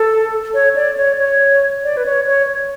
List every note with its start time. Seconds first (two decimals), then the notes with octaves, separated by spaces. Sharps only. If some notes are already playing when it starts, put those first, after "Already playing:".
Already playing: A4
0.54 C#5
0.75 D5
0.97 C#5
1.19 C#5
1.84 D5
1.97 B4
2.06 C#5
2.27 C#5